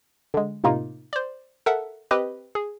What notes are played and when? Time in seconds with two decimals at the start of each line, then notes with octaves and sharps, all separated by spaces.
0.34 D3 G#3
0.64 A2 C3 A#3 D#4 F4
1.13 C5 D5
1.66 A4 A#4 E5 F#5
2.11 C4 G4 B4 D#5
2.55 G#4